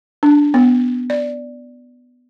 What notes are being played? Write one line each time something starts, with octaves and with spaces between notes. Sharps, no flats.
D4
B3
D5